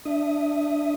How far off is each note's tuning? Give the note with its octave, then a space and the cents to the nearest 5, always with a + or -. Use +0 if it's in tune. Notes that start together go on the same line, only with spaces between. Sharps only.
D4 +0 E5 +0 D#6 +0